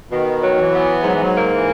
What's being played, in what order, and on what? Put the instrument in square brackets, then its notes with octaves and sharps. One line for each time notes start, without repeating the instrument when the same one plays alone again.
[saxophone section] B2 [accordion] D#3
[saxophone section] F#3
[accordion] E3
[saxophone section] B3
[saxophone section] G#2 [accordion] F#3
[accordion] E3
F#3
[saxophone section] A#3
[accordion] E3